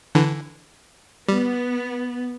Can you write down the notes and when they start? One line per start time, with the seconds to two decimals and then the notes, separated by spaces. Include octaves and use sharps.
0.15 D3 E3
1.28 G3 B3